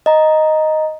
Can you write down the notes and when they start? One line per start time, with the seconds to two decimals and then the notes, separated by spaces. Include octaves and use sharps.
0.06 D#5 A#5